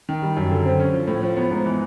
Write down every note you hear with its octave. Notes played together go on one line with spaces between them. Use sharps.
D#3
G3
F#2
D3
C4
C#4
F3
A2
F3
B3
G#2
E3